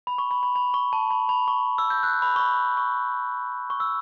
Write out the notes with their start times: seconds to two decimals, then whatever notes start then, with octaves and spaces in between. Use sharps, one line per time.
0.07 B5
0.18 C#6
0.31 B5
0.43 B5
0.56 B5
0.74 C#6
0.93 A5
1.10 B5
1.29 B5
1.48 C#6
1.78 E6
1.90 G6
2.03 F#6
2.22 B5
2.36 C#6
2.40 B5
2.77 C#6
3.70 C#6
3.80 E6